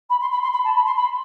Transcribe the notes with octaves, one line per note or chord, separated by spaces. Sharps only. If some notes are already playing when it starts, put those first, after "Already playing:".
B5
C6
B5
C6
B5
A5
B5
C6
B5